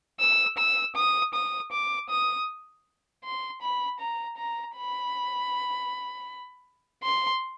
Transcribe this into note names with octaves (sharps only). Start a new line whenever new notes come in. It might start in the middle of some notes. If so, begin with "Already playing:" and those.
E6
E6
D#6
D#6
D6
D#6
C6
B5
A#5
A#5
B5
C6